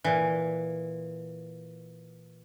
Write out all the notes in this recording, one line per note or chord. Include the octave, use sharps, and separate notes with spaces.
A#2 E3